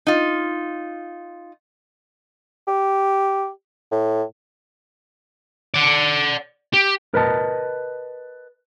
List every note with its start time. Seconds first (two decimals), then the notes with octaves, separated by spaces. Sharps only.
0.07 D#4 F4
2.67 G4
3.92 A2
5.74 D5 F#5
6.73 G4
7.14 A#4 B4 D#5 A5